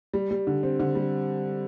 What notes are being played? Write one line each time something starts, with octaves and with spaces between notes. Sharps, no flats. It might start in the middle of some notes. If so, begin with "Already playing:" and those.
G3
G3
D3
C4
D3
G3